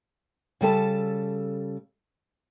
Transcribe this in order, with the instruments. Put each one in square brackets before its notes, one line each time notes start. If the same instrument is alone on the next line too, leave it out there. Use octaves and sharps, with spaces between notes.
[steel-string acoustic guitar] C#3 G3 A4 A5